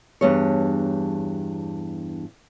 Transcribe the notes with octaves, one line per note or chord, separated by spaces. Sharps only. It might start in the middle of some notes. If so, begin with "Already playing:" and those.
E2 G2 C#5